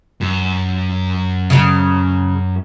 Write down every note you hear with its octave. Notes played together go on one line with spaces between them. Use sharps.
F#2
C#3 F#3